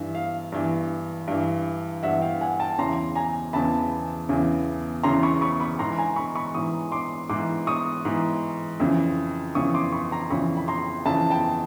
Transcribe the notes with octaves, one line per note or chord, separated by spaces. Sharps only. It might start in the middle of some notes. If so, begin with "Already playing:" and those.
Already playing: G2 E3 E5
F5
G2 E3
G2 E3
G2 E3 E5 F#5
F5 G5
F#5 G#5
G5 A5
E2 C#3 E3 A#5 C6
G#5 A#5
E2 C#3 E3 A5 B5
E2 C#3 E3
E2 C#3 E3 A#5 C6
B5 C#6
B5 C#6
B5 C#6
G#2 E3 A#5 C6
G#5 A#5
B5 C#6
B5 C#6
G#2 E3 C#6 D#6
C6 D6
G#2 E3 C6 D6
C#6 D#6
G#2 E3
F2 C#3 E3
F2 C#3 E3 C#6 D#6
C6 D6
B5 C#6
A#5 C6
F2 C#3 E3 B5 C#6
B5
A#5 C6
F2 C#3 E3 A5 B5
G5 A5